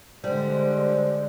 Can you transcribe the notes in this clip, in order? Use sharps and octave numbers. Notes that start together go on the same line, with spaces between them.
D3 G3 G#3 C5